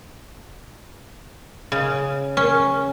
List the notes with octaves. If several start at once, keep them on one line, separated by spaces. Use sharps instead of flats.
C#3
C#4